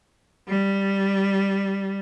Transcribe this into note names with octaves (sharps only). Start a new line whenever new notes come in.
G3